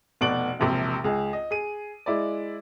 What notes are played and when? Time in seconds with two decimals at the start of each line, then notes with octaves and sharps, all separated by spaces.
0.21 F1 B2 F#4 D5 D7 F#7
0.60 E1 A#1 C3
1.04 C#2 G#4
1.33 D#5
1.51 G#4 D#7
2.06 G#3 E4 D5